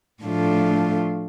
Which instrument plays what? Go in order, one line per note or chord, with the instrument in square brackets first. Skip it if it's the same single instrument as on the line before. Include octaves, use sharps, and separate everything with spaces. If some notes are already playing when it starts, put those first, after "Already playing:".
[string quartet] A2 F3 A3 D4 F4